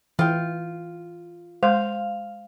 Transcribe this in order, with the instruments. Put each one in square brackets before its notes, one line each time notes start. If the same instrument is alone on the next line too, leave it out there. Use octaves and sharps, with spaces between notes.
[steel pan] E3 [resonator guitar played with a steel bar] F4 G5
[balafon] G#3 [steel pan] C5 [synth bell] F5